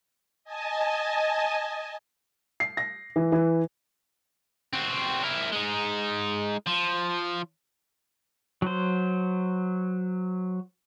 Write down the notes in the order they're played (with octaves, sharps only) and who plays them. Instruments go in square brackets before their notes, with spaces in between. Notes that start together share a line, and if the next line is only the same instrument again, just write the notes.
[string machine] D#5 G#5 A5
[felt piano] C7
A#6
E3
E3
[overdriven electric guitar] C4 F#4
E4 A#4
G#3 D#4
F3
[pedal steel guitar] F#3 C5